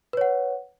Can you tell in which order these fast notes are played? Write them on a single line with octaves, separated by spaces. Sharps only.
B4 C#5 F#5